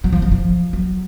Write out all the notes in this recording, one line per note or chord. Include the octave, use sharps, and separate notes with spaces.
F#3
F3
D#3
F3
F#3